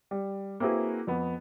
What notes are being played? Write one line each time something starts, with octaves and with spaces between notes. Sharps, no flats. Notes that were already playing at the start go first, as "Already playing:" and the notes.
G3
A#3 C4 E4 F#4 G#4 B4
F2 B3